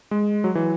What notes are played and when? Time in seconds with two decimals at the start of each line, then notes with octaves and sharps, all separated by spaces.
0.11 G#3
0.44 F#3
0.55 E3